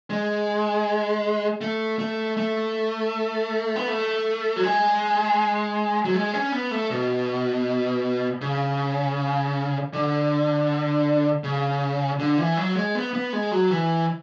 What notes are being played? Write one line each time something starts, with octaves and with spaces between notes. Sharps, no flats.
G#3
A3
A3
A3
B3
A3
F#3
G#3
F#3
G#3
C#4
B3
A3
B2
C#3
D3
C#3
D3
E3
F#3
G#3
B3
B3
G#3
F#3
E3